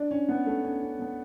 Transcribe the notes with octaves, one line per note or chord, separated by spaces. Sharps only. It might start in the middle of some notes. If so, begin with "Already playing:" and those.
Already playing: D4
C#4
B3
A3
C#4
C#4
B3